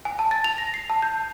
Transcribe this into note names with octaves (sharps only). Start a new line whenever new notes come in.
G#5
A5
A6
F7
A#6
C7
A5
G6